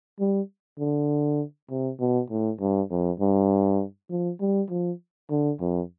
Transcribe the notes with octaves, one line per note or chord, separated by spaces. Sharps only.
G3
D3
C3
B2
A2
G2
F2
G2
F3
G3
F3
D3
F2